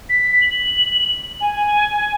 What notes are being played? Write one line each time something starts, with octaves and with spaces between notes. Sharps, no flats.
B6
F#7
G#5